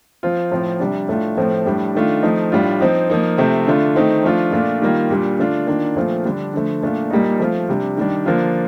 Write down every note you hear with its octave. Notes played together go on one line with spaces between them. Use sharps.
F3 C4 F4
A2 F3 C4 F4
C3 G3 D4
A2 A3 D4 F4
A2 F3 A3 C4
A2 G3 D4
D#3 A3 D4 F4
F3 A3 C4 D#4
A2 G3 D4 F4
F3 C4 D#4
F3 A#3 D#4
C3 F3 A3 C4
D3 A3 D4 F4
D#3 A3 C4 D#4
F3 A3 D4 F4
A#2 A3 D4 F4
D#3 G3 A#3 F4
A#2 G3 D4 F4
D3 A3 D4 F4
D#3 A#3 D4 F4
A#2 F3 A3 C4 F4
D3 G3 D4
D3 F3 A3
A#2 A3 D4 F4
A#2 G3 A#3 D#4
F3 A3 C4 F4
C3 G3 D4
D#3 G3 D4
D3 F3 A#3 D4 F4